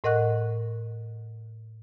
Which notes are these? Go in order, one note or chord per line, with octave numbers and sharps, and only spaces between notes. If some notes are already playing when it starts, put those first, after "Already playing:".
A2 A#4 D#5 F#5 C#6 F#6